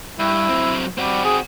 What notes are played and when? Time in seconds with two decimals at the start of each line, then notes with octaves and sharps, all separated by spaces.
0.19 G2 E4
0.49 F#3 C4
0.98 G3 C4 F#4
1.24 G#4